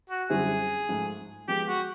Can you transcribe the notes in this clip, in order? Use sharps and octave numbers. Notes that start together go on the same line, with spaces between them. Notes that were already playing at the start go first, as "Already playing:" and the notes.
F#4
F#2 D3 G3 C4 E4 G#4
G#2 F3 A3
F3 G#3 B3 G4
F#4